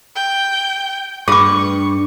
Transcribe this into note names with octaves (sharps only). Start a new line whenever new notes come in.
G5
G2 G#4 B4 C#6 D6